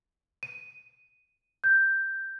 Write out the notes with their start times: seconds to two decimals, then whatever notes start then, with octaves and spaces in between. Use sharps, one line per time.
0.43 D#7
1.64 G6